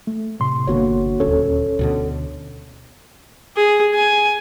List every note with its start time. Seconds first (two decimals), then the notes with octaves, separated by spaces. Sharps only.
0.07 A3
0.40 A2 C3 C6
0.67 G1 B2 D3 A#3 F#4 C#5
1.20 D#1 D2 C#4 A4 C#5
1.79 D2 B2 D3
3.56 G#4
3.94 G#5